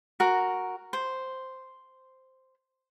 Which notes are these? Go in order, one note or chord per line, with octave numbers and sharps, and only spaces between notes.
F#4 A#4
C5